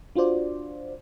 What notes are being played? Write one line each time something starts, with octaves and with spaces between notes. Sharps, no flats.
D4 F4 F#4 C5 D5